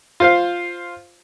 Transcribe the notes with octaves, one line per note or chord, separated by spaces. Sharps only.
F4 C5 F5